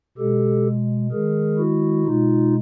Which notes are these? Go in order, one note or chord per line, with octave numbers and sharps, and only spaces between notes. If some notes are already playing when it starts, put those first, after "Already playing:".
B2 G#3 G4 A4
D#3 G#3 G#4 A#4
E4 F#4
B2 G#3 D#4 F4